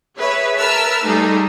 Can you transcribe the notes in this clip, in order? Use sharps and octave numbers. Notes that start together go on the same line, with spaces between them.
G#4 B4 C#5 E5
A#4 B4 E5 A5 E6 F6
G3 A3 D#4 G#4 A4